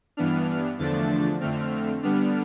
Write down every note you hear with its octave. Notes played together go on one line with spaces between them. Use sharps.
G2 E3 B3 D4 F6
E2 D3 F3 A3 D4 A6
F2 D3 A3 C4 F6
D3 G3 B3 D4 F6